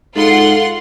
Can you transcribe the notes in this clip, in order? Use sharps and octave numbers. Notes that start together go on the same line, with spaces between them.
G#2 F4 A4 F#5 C6